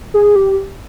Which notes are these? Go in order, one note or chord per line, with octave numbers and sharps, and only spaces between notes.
G#4
G4